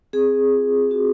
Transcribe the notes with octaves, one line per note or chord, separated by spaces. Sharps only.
C4 G#4
F4
C4 F#4